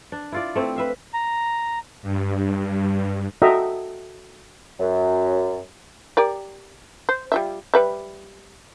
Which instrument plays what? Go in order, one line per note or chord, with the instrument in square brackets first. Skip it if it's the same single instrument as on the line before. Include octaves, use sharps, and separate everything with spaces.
[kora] D4
E4 F4 D5
A3 C4 E4
B4 E5 F5
[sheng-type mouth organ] A#5
[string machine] G2
[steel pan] F#4 A4 D#5 E5 G5 A#5
[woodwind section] F#2
[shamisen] G4 A#4 D5
C5
G3 F4 E5
G3 B4 E5